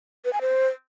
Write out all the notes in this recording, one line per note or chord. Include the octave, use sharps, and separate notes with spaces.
B4
G#5
C5